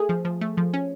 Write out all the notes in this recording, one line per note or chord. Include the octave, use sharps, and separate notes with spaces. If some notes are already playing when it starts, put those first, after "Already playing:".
Already playing: A3 G#4
F3
F3
A3
F3
C#4